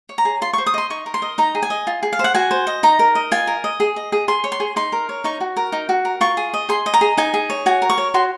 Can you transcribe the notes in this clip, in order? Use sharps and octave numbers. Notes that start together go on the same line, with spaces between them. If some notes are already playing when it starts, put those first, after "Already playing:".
C#5
A#5
G#4
F4 C6
C#6
C5
D#6
D#5 C6
D#4 C#6
A#4
C6
D#5
D#4 A#5
G#4
G#5
D#5
F4
G#4
F5
C5
F#5
F#4 G#5
C5
D#5
D#4 A#5
A#4
D#5
F4 G#5
A#4
D#5
G#4
D#5
G#4
G#4 C6
C#5
C6
G#4
D#4 C6
A#4
C#5
D#4 C#6
F#4
A#4
D#4
F#4
A#4
F4 C#6
G#4
D#5
G#4 C6
D#5
A#5
G#4
D#4 G#5
G#4
C#5
F#4 G#5
A#4
C#6
C#5
F#4 C6